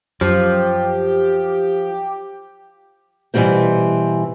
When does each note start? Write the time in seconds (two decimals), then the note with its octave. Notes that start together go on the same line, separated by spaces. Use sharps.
0.21 F#2 F3 G4
3.34 B2 E3 F#3 G3 A#3 C4